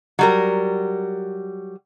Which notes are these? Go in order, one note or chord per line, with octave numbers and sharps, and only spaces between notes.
F#3 G3 A#4